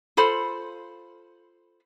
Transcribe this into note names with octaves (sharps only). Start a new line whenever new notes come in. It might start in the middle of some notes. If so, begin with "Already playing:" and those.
F4 A4 C5 B5